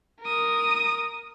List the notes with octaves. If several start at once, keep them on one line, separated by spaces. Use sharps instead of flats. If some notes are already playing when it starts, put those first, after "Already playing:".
A#4 D#6